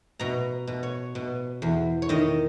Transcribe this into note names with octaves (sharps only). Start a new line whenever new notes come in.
B2 A#5
B2
C#5
B2
E2
C#5
D#3 D#5